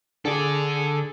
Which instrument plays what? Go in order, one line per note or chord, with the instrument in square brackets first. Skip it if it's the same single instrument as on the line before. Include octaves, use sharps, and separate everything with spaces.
[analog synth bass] D3 [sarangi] G#4 [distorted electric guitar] A4 D5